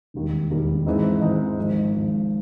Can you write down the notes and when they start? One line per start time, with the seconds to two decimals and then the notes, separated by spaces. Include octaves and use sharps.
0.14 E1 D#2 D#3 G3
0.50 E1 D#2 D#3 G3
0.86 G#2 E3 G#3 C4 D#4
1.22 G#2 E3 G#3 C4 D#4
1.58 G#1 G#2 F3
1.94 G#1 G#2 F3